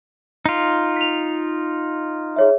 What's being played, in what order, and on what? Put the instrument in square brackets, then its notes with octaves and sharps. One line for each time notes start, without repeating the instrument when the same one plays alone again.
[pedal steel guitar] D#4 F4
[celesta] B6 F7
G#4 C#5 E5